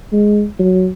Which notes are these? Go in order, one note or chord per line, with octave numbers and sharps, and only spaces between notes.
G#3
F#3